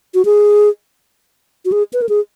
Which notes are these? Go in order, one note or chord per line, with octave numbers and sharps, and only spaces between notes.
F#4
G#4
F#4
G#4
B4
A#4
G#4